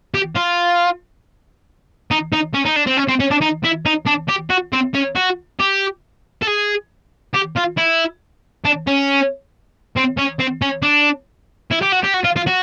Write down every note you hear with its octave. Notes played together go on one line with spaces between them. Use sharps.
G4
F4
D#4
D#4
C#4
D#4
D4
C4
C#4
C4
C#4
D4
D#4
E4
D#4
D4
G4
F#4
C4
C#4
F#4
G4
A4
G#4
G4
F4
E4
D4
C#4
C4
C#4
C4
C#4
D4
E4
G4
F#4
G4
F#4
F4
F4
F#4